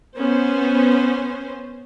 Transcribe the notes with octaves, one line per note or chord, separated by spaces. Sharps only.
B3 C#4 C5